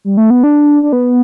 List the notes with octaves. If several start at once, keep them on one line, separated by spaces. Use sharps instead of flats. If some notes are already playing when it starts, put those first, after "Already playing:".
G3
A3
B3
D4
D4
B3